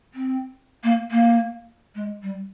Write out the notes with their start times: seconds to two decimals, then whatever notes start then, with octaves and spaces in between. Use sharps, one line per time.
0.14 C4
0.83 A#3
1.11 A#3
1.95 G#3
2.22 G3